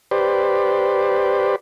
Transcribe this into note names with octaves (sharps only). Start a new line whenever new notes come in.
G4 B4 C5 D5